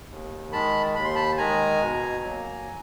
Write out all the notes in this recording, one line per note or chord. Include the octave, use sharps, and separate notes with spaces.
D#2
D#3 G#3 A5 B5
D#2 B5
C6
A5 B5
D#3 G#3 G#5 A#5
B2
F#3 A#3